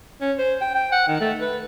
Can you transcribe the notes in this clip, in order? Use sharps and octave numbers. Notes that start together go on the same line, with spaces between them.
C#4
C5
G5
G5
F#5
D#3
A3
B4